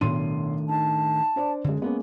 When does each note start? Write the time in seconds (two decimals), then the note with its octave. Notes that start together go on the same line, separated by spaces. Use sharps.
0.01 B1 A2 D#3 D4 C6 D#7
0.69 D#4 A5
1.36 D4 C5 D5
1.64 F#2 D3 G#3
1.82 G#3 A#3 B3 C#4